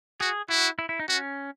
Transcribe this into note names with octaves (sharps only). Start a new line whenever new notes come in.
F#4 G#4
E4 F#4
E4
E4
D#4
C#4 F#4